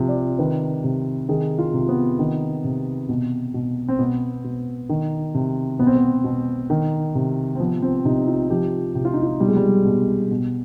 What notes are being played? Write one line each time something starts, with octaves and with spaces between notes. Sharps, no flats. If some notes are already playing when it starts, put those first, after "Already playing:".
Already playing: C3 F3
D5
D#3 B4
C3
D#3 G#4
F4
C3
B3
D#3
C3
B2
B2
C4
B2 B3
B2
D#3
C3
B2 B3
C4
B3
B2
D#3
C3
C4
F3 B3
C4
C3 D#4
F4
F3 G4
C3 G4
F4
D#4
F4
B2 G3
G#3
G3
B2
B2